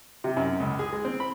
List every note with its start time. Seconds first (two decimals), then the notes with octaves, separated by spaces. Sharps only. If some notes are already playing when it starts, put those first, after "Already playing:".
0.24 C3
0.37 F#2
0.60 C#2
0.79 G#4
0.92 G#3
1.05 C4
1.20 B5